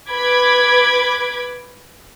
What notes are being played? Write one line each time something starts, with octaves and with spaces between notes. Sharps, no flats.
B4 B5 D6 G#6